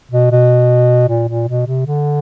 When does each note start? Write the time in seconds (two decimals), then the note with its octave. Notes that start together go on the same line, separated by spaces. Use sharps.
0.11 B2
0.31 B2
1.08 A#2
1.28 A#2
1.48 B2
1.66 C3
1.86 D3